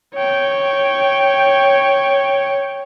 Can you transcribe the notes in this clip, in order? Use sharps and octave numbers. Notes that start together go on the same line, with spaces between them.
C#5 G5